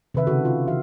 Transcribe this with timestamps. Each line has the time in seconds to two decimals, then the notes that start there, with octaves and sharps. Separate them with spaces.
0.14 C3 D#3 B4 E5
0.27 C#3 F#4 A4
0.45 F4
0.67 E3 F#4 E5 F5